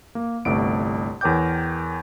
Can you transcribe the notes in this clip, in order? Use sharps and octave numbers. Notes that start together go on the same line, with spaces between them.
A#3
G1 C2 A3 B3 D7
E2 A#4 C#5 G5 D6 G6